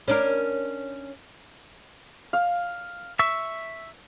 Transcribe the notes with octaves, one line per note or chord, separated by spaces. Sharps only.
C#4 D4 A#4
F5
E5 C#6 E6